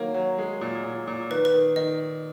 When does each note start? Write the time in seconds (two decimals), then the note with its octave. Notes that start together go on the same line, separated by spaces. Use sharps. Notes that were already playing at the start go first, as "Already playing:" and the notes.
Already playing: D#3 F#3 A#3 C#5
0.14 F#3
0.38 G#3
0.61 A#2
0.84 A#2
1.07 A#2
1.30 D#3 B4
1.45 B4
1.54 D#3
1.76 D#3 D#5